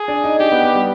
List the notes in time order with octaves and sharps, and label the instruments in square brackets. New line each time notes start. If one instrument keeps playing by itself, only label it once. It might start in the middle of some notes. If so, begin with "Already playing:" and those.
Already playing: [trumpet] G#4
[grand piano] D4
D#4
[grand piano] D4 [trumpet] G4
[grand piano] B3
B3
G3